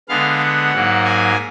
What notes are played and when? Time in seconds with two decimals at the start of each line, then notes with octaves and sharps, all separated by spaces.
0.09 D3 G#3 B3 F5
0.41 F#5
0.72 G#2 F#3 A#3
1.05 G#5